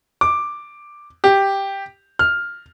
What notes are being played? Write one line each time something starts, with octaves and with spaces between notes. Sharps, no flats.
D6
G4
F6